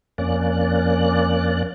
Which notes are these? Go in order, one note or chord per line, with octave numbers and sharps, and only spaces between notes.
F2 A#3 C#4 D5 F#6